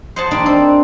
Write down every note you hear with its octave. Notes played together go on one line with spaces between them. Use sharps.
C5 D#5 F#5 G#5 A5
G3 A#3 D4 D#4 D5
C4